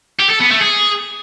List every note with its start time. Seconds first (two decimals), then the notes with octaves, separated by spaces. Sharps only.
0.19 G4
0.29 A4
0.40 B3
0.50 A3
0.60 G#4